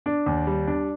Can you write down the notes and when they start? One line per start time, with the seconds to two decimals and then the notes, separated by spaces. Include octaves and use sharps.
0.06 D4
0.26 D#2
0.47 G3
0.67 D4